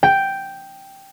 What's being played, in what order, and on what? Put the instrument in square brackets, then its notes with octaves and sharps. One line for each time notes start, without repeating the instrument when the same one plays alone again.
[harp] G5